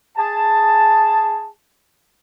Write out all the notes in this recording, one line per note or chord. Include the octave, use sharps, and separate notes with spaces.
G#4 A5